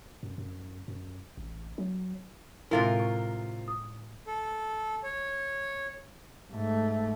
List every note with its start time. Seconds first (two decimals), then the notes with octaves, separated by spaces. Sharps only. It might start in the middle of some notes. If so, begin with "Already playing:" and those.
0.23 F#2
0.38 F#2
0.88 F#2
1.37 A1
1.78 F#3
2.71 A2 C3 G#3 E4 F4 A#4
3.00 C#6
3.68 D#6
4.27 A4
5.03 C#5
6.52 G#2 A3